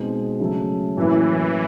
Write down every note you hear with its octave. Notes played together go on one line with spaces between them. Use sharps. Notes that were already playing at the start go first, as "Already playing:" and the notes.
Already playing: B2 G#3 C4 D#4
C#3 F#3 A3
A2 E3 F#3 A#3 C#4 E4